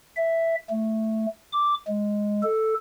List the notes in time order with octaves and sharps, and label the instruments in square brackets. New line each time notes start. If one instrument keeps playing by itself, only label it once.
[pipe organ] E5
A3
D6
G#3
A4